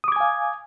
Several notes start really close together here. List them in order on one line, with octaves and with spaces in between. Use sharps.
D#6 D6 G#6 G#5 F5